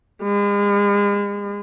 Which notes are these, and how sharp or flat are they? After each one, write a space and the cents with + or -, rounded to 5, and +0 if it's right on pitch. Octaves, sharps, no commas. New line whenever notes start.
G#3 -40